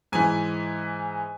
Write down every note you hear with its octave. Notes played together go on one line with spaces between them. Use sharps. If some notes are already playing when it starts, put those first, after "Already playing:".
G#2 E3 G#5